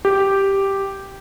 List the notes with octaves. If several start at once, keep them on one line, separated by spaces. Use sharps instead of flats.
G4